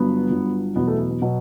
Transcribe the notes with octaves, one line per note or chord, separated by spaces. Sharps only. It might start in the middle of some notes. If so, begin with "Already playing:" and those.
Already playing: G1 G2 F#3 B3
G1 G2 F#3
E2 B2 F#3 B3
A3
B3
B3
B2 F#3